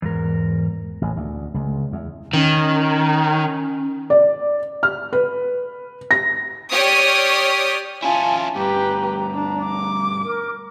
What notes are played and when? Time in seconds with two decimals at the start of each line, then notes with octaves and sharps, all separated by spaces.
0.02 E2 G#2 A#4
1.02 A1
1.16 D2
1.54 C#2
1.92 E2
2.33 D#3 C#4
4.10 D5
4.83 F6
5.13 B4
6.11 A#6
6.71 G4 C#5 D5 D#6 F6
8.02 C#4 E4 F4 G#5 A5
8.56 D2 G2 G4 B4 A#5
9.34 D4
9.64 D6
10.24 A#4